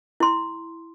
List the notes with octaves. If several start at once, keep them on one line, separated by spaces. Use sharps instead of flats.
E4 C6